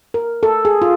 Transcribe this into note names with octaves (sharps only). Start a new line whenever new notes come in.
A#4
A4
G#4
F4